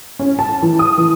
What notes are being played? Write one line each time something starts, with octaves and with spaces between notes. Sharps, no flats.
C#4
A5
E3
D#6
E3